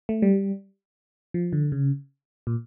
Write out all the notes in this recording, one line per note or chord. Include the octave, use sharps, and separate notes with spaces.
A3
G3
F3
D3
C#3
A#2